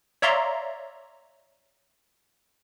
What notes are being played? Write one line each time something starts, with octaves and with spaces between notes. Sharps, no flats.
C#5 D5 E5 F5 A#5 C6